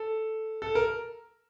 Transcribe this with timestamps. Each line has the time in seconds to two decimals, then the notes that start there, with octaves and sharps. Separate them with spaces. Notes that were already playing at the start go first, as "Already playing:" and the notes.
Already playing: A4
0.62 A4
0.75 A#4